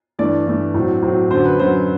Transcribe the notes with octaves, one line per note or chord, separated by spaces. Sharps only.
G2 E3 A3 D5
G2 E3 A3
A2 F#3 C4
A2 F#3 C4
F#2 D3 F#3 C5
B4
F#2 D3 F#3 C5